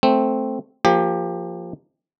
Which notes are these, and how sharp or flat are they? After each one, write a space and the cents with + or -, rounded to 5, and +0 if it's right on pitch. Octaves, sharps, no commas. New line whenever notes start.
A3 +0 C4 +0
F3 +0 A#3 +0 G4 +25